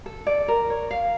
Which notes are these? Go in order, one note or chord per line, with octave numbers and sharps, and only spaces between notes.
A4
D5
A#4
C#5
F5